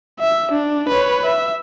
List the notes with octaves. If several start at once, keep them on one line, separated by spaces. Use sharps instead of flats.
E5
D4
B4 C#5
E5